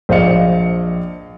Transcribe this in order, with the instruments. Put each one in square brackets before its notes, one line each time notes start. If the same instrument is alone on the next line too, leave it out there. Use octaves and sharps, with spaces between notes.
[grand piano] A#1 C5 D#5 F5 C#7